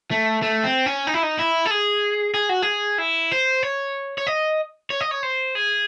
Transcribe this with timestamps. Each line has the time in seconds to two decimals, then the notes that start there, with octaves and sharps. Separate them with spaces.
0.11 A3
0.42 A3
0.64 C4
0.86 C#4
1.07 D#4
1.14 E4
1.23 D#4
1.39 E4
1.66 A4
1.71 G#4
2.34 G#4
2.49 F#4
2.62 G#4
2.98 E4
3.32 C5
3.63 C#5
4.18 C#5
4.27 D#5
4.90 C#5
5.01 D#5
5.11 C#5
5.23 C5
5.55 G#4